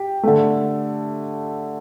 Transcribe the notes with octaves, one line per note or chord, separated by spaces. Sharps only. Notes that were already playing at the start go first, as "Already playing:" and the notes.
Already playing: G4
D3 A3